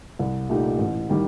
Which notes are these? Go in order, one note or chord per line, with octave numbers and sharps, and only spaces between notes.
C2
A#2 A3 D#4 G4
A1
D#3 G3